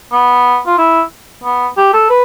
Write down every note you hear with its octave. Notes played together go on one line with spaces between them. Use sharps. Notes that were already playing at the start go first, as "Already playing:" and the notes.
B3
F4
E4
B3
G4
A4
B4